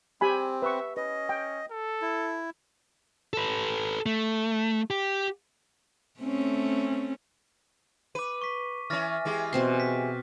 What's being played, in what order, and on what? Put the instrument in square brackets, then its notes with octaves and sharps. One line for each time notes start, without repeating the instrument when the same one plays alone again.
[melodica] C4 [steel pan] G4 G#5 B5
[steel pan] B4 C#6 [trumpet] E5
[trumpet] C#4 [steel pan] B4 [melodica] D#5
[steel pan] G5
[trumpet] A4
[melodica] E4
[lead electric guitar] A4 B4
A3
G4
[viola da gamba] A3 C4 C#4
[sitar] B4 [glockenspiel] D6 D#7
[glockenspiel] C#6 B6
[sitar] E3 C#4 [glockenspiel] F6 A6 A#6
[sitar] E3 G#3 G4
[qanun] B2 C4 C6
[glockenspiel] B6